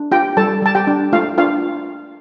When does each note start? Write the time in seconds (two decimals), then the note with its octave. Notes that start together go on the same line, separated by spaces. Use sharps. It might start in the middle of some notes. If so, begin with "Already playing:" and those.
Already playing: D4
0.12 F4 G4 G5
0.37 G3 A4 A5
0.62 G3 A5
0.75 G4 G5
0.87 D4
1.13 A3 F4 F5
1.38 D4 F4 F5